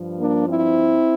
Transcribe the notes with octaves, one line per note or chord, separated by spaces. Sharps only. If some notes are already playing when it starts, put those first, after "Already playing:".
Already playing: G2 F3
A#3 D4
C4 E4